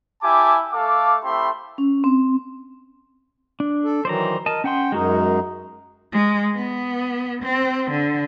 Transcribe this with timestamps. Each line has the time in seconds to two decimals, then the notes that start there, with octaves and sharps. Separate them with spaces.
0.22 E4 G4 G#5 A5 D6
0.73 A3 A4 F5 D6
1.24 A3 C4 E4 G4 B5 C6
1.78 C#4
2.04 C4
3.60 D4
3.84 A4
4.05 D#3 E3 F#3 C5 D5 A#5
4.46 A#4 D#5 A5
4.64 C#4 F#5 G5 C6
4.92 F#2 G#3 D#4 F#4 A#4
6.13 G#3
6.54 B3
7.42 C4
7.90 D3